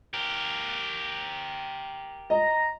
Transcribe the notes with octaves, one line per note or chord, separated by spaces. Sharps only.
G4 A#4
D#5 A#5